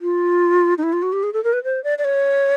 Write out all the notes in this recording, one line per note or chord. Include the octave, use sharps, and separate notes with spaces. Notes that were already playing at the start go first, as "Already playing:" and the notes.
F4
D#4
E4
F4
F#4
G4
G#4
A4
A#4
B4
C5
D5
D5
C#5